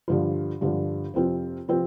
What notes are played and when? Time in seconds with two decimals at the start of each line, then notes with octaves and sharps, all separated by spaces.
0.08 G2 D3 F3
0.61 G2 D3 F3
1.14 F2 C3 F3 C4 F4
1.68 C3 F3 C4 F4